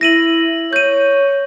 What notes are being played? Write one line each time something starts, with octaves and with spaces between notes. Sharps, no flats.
E4 A#6 D#7 F#7
C#5 G6 D#7